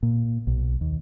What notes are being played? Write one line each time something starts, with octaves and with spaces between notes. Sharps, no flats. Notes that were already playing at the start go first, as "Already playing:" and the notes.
A#2
B1
D#2